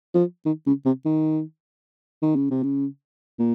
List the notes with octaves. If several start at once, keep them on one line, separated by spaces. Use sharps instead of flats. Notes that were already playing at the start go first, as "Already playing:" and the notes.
F3
D#3
C#3
C3
D#3
D#3
C#3
C3
C#3
A#2